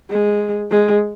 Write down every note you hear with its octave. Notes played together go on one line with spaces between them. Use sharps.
G#3
G#3